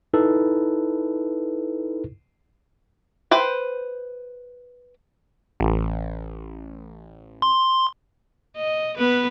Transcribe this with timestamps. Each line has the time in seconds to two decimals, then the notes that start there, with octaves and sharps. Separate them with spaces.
0.14 D#4 E4 A4 B4
3.31 B4 C5 G5
5.60 A1
7.42 C6
8.56 D#5
8.97 B3 B4